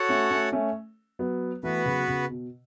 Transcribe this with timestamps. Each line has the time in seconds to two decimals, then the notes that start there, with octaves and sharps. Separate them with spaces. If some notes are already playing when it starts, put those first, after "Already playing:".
Already playing: F#4 A4 C#5 F#5
0.09 A3 C#4
0.31 A3 C#4
0.52 A3 C#4
1.19 F#3 B3
1.63 E3 A3 B3 F#4 B4
1.85 C#3 F#3
2.08 C#3
2.29 B2